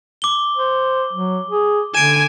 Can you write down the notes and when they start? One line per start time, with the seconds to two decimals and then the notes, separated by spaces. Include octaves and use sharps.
0.22 D6 G7
0.56 C5
1.13 F#3
1.51 G#4
1.95 D3 G#5 D7 E7